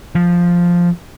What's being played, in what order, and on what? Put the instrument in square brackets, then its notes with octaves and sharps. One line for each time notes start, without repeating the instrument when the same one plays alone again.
[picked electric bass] F3